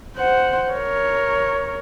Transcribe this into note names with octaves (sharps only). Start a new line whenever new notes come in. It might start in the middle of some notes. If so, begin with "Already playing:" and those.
C5 F#5
A#4 C#5